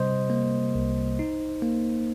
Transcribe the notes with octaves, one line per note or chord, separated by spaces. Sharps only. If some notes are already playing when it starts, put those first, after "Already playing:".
Already playing: C3 G3 C5 D#5
A#3
C2
D#4
A#3